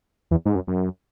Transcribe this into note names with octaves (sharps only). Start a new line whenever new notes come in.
E2
G#2
F#2
F#2